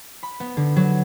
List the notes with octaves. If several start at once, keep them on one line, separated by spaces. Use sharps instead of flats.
B5
B3
D3
F#3